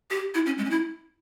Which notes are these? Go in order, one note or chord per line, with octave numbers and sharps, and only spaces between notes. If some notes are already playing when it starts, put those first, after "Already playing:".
G4
E4
C#4
G#3
C#4
E4